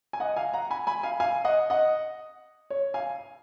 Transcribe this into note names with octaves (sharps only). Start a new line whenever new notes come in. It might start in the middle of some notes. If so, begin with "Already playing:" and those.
G#5
D#5 F#5
F5 G#5
F#5 A#5
G#5 B5
G#5 B5
F5 G#5
F5 G#5
D#5 F#5
D#5 F#5
C#5
F5 G#5